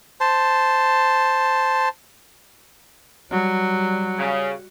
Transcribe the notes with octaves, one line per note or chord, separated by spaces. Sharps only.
C5 A5
F#3 G3
C#3